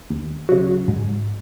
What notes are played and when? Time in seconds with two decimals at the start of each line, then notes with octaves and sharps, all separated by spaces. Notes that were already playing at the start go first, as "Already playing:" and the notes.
0.10 D#2
0.49 C#3 F#3
0.88 G#2